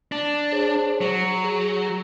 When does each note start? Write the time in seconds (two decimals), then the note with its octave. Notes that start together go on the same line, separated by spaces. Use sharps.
0.12 D4
0.52 G#4 C5 C#5
1.01 F#3
1.44 G#4 G6